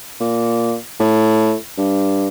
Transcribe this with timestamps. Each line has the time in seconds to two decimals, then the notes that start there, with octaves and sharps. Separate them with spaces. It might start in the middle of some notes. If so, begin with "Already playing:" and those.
0.21 A#2
1.00 A2
1.78 G2